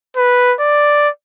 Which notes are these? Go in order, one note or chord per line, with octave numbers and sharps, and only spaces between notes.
B4
D5